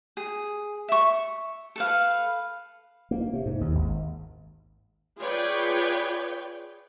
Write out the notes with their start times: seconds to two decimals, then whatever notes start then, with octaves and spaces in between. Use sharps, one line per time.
0.17 G#4
0.88 E5 C#6
1.76 A4 B4 F5
3.11 A#3
3.33 C3
3.46 G#2
3.61 D#2
3.75 G#1
5.18 F4 G#4 B4 C#5 D5 G5